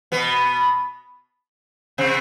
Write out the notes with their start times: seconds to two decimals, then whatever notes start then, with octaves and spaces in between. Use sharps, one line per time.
0.12 B2 B3
1.98 C3 C4